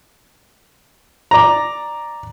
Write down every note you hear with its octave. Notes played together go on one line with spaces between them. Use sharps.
D5 A#5